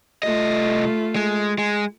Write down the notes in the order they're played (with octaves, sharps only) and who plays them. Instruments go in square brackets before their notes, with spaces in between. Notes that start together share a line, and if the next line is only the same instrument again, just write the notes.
[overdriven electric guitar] C2 D#5 [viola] A3 F4
[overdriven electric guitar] G#3
G#3